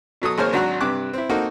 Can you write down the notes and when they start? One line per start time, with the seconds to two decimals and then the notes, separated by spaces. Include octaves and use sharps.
0.22 B2 F#3 A4 D#6
0.38 G#1 G#3 A#3 C5 C#5 F6
0.53 G#1 F#3 D4 F#4 A#5 F#6
0.81 G2 C3 D6 F#6
1.13 C4 E4
1.30 A#3 C4 D#4 F#4 A4